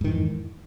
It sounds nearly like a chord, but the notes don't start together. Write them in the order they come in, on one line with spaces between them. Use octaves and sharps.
G#2 D#3 E3 F2